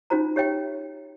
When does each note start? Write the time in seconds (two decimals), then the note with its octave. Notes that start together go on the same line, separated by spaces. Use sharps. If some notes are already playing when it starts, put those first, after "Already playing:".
0.10 C#4 D#4 F4 F#4 C5 A#5
0.36 G4 C#5 E5 G5